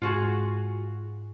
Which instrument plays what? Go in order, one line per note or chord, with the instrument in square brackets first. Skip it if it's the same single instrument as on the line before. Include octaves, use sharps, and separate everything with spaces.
[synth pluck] G#2 [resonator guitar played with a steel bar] F4 F#4 G#4